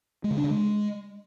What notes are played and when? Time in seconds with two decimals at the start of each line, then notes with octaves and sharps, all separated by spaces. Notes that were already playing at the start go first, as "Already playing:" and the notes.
0.24 G#3
0.31 C#3
0.37 D4
0.44 C#3
0.50 G#3